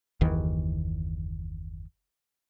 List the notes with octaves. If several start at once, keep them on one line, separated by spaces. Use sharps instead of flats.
F#1 D#2 D#3 E3